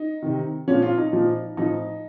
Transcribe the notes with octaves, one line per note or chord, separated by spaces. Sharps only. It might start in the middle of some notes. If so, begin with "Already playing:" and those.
Already playing: D#4
C3 D#3
A#2 F3 C#4
F4
D#4
A#2 F3
A2 F3 D#4